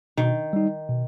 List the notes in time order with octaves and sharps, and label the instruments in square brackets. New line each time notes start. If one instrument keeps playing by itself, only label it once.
[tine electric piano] B2 [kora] D#3
[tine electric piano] G3 D#4
B2